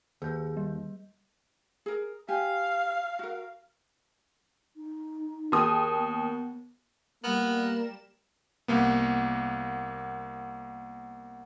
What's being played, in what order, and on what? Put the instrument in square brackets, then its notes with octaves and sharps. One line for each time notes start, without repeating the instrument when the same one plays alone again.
[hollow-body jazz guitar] D#2 [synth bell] G#4 G6
[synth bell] G3
[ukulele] G#4 A#4
[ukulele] G4 G#5 [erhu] F5
[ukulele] F#4 A#4
[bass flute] D#4
[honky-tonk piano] D#2 D#6 [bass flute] G#4
[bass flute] B3
[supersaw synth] G3 E7 [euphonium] A#3 [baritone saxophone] B3 [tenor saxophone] A#4
[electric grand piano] C2 A#3 B3